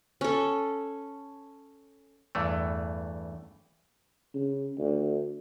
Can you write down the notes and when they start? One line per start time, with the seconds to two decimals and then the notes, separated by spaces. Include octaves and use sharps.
0.21 C#4 A4
2.35 E2 G2 E3 A3
4.34 C#3
4.78 D2